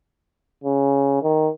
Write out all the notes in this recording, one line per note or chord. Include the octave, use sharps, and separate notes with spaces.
C#3
D#3